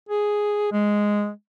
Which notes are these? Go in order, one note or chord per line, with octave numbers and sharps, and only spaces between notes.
G#4
G#3